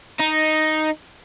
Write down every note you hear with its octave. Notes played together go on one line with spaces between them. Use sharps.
D#4